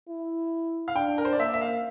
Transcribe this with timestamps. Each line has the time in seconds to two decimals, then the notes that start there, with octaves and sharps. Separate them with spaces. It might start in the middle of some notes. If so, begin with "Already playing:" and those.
0.08 E4
0.88 F5
0.95 D4 G5
1.18 A#4
1.25 C5
1.33 D5
1.39 A#3 E5
1.54 E5
1.61 F5